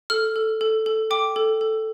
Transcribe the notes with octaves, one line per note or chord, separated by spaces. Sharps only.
A4 F6
A4
A4
A4
G5 D6
A4
A4